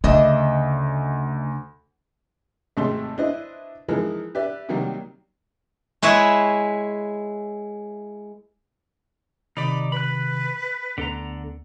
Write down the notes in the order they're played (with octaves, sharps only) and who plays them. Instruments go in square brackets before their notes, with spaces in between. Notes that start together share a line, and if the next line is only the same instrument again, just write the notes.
[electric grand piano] D2 [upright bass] C#3 [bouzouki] D4 D#5 E5
[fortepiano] G#1 G#2 C3 A3 A4 C6
D4 E4 B4 C5 D#5
E3 F3 G#3 D#4 A#4
G4 B4 D5 E5
C3 D#3 F#3 G3 A#3
[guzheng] G#3 E4 B4 C#5 E5
[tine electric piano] C3 D#3 [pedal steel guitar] D#4 D5 [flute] B5
[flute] B4 [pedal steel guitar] B5 F#6
[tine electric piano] D2 B3 [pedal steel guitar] D3 A4 A#5